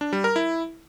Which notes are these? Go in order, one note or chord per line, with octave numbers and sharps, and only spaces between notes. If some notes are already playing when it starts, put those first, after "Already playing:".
D4
G3
A#4
E4